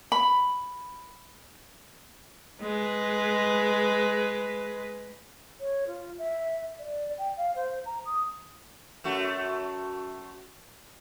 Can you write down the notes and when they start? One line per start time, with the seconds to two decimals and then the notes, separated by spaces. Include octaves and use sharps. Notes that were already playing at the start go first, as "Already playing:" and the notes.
0.12 B5
2.61 G#3 B4
5.60 C#5
5.87 F4
6.18 E5
6.79 D5
7.18 G5
7.37 F5
7.55 C5
7.85 A#5
8.05 D#6
9.04 F#2 A3 F#4